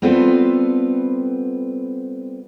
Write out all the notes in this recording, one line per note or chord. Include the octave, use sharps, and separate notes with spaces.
G3 B3 C4 F4 A4 B4